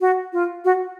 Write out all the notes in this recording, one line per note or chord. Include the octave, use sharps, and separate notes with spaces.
F#4
F4
F#4